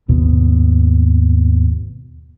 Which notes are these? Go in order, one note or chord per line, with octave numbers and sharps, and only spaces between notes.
G#1 D#2 B2 B3